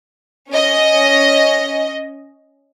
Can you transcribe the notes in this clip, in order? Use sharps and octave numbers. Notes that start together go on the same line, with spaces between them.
C#4 D#5